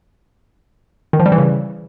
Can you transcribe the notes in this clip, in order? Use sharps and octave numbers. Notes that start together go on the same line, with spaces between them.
D#3
F3
G3
E3
C#3